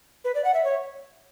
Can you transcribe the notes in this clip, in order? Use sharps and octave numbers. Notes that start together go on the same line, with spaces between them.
B4
D5
F#5
E5
C#5